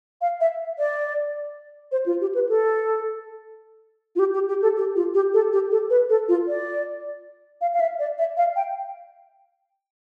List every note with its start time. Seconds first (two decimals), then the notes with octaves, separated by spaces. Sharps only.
0.21 F5
0.41 E5
0.79 D5
1.92 C5
2.06 F4
2.21 G4
2.35 B4
2.49 A4
4.16 F4
4.19 G4
4.34 G4
4.48 G4
4.62 A4
4.77 G4
4.96 F4
5.14 G4
5.34 A4
5.52 G4
5.71 A4
5.90 B4
6.09 A4
6.28 F4
6.48 D5
7.61 F5
7.74 F5
7.80 E5
7.99 D5
8.18 E5
8.37 F5
8.56 G5